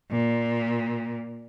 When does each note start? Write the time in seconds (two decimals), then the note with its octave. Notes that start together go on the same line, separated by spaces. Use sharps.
0.11 A#2